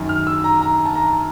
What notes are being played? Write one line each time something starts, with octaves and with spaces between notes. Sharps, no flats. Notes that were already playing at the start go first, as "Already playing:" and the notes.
Already playing: F#2 D#3
F6
E6
A#5
A#5
A5
A#5